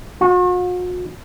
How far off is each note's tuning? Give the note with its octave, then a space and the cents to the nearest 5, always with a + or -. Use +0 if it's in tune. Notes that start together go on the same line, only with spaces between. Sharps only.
F#4 -45